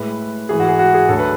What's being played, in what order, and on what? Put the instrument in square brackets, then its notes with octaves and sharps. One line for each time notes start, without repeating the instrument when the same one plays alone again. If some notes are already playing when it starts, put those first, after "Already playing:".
Already playing: [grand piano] A2 G#3 B4
G#2 E3 G#3 G#4
F#4
G#4
F#4
G#4
D2 D3 F#3 A3 A4
B4